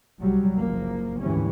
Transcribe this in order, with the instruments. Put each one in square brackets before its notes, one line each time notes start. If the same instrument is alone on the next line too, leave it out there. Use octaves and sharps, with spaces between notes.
[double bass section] C2 F#3 G3
F#1 F3 A#3
D2 G#2 D3 E3 G3 C#4